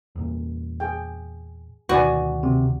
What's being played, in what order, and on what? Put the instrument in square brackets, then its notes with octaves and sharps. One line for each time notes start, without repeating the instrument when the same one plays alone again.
[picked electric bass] E2 A#2
[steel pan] G#4 G5
[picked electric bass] D2 B2 D#3 [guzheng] F#4 [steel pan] B4 D5 G#5
[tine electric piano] C3